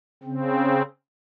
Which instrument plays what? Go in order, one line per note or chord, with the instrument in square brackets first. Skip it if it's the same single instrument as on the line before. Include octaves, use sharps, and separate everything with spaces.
[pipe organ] C#3 C4